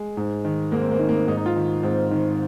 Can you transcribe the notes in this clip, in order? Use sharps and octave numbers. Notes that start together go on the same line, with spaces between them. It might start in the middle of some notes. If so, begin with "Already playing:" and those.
Already playing: G#3
G#2
D#3
G#2 A#3
C4
A#3
D#3
A#3
G#2 D#4
D#4
F4
D#3
G#2 C4
D#3